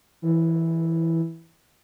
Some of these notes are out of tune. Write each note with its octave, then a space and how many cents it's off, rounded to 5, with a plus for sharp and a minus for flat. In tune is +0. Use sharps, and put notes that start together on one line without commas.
E3 -5